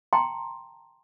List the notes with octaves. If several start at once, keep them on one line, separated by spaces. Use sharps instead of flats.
G5 A5 A#5 C6